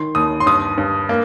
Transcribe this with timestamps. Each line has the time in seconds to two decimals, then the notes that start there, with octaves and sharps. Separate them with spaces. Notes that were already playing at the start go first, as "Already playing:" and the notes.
Already playing: D#3 C6
0.15 D#2 D#6
0.40 C6
0.46 G2 D#6
0.78 G2
1.09 A#3